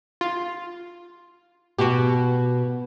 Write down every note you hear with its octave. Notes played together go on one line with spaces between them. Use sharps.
F4
B2 F#4 G4